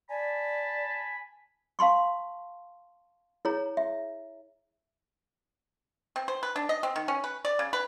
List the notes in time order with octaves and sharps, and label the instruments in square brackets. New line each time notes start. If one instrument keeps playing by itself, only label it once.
[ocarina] D5 [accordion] G#5 [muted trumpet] A5 [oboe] B5
[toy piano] F5 A5 C6 C#6
E4 G#4 C#5 A#5
E5
[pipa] C4
C5
B4
D4
D#5
C4
D#3
C#4
B4
D5
C#3
B4